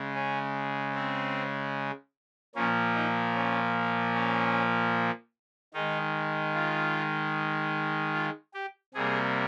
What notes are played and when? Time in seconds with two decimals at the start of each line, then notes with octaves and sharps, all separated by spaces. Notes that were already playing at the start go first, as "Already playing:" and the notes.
Already playing: C#3 G#3
0.15 C#4
0.95 C4
2.55 A#2 F3 A#3 C#4
2.95 D#4
3.35 C#4
4.15 C#4
5.74 D#3 G#3 D#4
6.55 F4
8.14 F4
8.54 G4
8.94 C3 G3 A#3 G#4